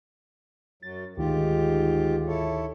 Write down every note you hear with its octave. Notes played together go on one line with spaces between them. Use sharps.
F#2 F#3 A6
D2 G#2 D#3 F4 G4
E4 A4 C#5